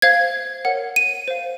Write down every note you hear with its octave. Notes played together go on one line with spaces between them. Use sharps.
C5 F5 G#6
A#4 C#5 F#5
D#7
C5 F5